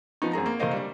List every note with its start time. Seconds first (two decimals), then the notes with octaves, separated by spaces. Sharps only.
0.22 F3 B3 D#4
0.33 F#2 C4 G#4 A#5
0.46 A#3
0.59 F#1 A3 A#3 C5 D#5 F5
0.73 G3 D4